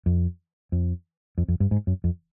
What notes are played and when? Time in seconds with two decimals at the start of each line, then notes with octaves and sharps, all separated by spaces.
0.06 F2
0.72 F2
1.38 F2
1.48 F2
1.60 G2
1.71 G#2
1.87 F#2
2.04 F2